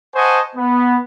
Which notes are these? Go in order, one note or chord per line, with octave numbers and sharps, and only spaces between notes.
C5 D#5 F#5 G#5 A5 C#6
B3